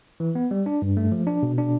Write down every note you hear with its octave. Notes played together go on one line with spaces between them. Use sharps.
E3
B3
G3
D4
G2
A3
F3
D4
B2
D4